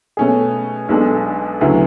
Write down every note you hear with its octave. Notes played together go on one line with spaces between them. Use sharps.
B2 A3 C#4 G#4
B1 B2 G#3 D4 A4
D2 C#3 F#3 B3 E4